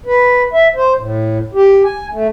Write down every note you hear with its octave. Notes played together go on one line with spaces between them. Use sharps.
B4
E5
C5
A2
G4
G#5
A3